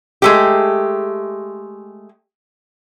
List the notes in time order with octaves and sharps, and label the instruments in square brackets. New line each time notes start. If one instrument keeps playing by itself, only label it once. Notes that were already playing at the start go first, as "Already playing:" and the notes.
[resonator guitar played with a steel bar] G#3 A3 G4